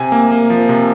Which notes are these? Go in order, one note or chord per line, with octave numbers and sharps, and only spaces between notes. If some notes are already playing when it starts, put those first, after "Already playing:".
Already playing: C3 G#5
A#3
A#3
F3
C3